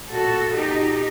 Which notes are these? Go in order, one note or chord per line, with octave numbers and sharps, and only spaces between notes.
A#2 F#4 A4
A#2 D#4 G4